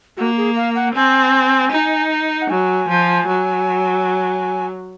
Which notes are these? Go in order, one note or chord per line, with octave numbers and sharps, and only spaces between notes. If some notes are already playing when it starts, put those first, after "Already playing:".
A#3 F#4
G#4
F5
F#5
C4 G#5
D#4
F#5
F#3 G#5
F3
F#3